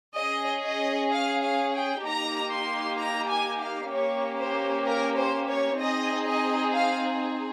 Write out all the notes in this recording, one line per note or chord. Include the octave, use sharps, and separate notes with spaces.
C#4 G#4 D#5
D#5
F5
F5
G5
A#3 D#4 G4 A#5
C6
A#5
G#5
F5
A#3 C#4 G4 C#5
C5
A#4
C5
C#5
C4 D#4 G#4 D#5
D#5
F5